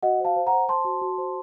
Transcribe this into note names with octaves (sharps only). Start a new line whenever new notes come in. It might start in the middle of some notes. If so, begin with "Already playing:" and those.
F#4 D#5 F#5
C5 F5 A5
C5
F#5 A#5
C5
C5 A5 C6
F#4
F#4
C5